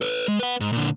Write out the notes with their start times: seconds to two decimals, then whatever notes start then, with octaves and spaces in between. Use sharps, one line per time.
0.01 A4 B4
0.28 G#3
0.39 B4 F#5
0.61 G#2
0.73 A#2 D3